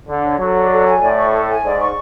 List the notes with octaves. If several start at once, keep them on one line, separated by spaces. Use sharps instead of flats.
D3 D4
C#5
F#3 A4
D4
A4
G#5
A2 D5
C#6
A4
G#5
G#2 D5
C#6